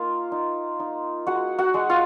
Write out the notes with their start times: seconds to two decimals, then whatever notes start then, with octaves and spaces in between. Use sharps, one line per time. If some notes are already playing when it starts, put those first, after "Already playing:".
Already playing: A#3 D#4 F4
0.32 D#4
0.80 D#4
1.27 G#3 F#4 F#5
1.58 F#4 F#5
1.74 G#3
1.89 F4 F5